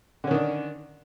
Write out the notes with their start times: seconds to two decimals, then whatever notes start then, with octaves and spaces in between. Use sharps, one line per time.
0.24 D3
0.27 C#4
0.31 D#3
0.34 D4